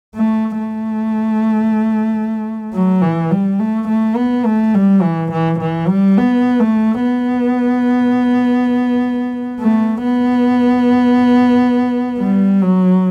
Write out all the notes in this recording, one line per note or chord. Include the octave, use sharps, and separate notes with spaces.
A3
A3
F#3
E3
G3
A3
A3
B3
A3
G3
E3
E3
E3
G3
B3
A3
B3
A3
B3
G3
F#3